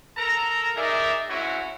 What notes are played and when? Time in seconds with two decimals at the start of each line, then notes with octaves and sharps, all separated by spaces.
0.17 A4 A#4 A#5
0.76 D#4 G#4 A#4 D5 E5
1.30 G#3 C4 C#4 E4 F#4